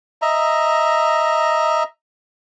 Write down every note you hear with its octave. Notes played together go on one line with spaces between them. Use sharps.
D#5 E5 A#5